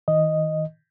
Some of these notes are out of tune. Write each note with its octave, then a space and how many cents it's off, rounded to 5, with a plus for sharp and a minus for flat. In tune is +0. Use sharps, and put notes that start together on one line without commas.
D#3 +35 D#5 +0